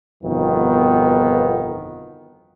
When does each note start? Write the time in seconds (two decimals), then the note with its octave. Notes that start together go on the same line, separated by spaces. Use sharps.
0.24 G1 F2 B2 D#3 F3 B3